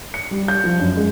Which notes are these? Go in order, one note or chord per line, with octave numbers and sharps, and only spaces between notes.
C#7
G3
G6
F3
F#2
G#3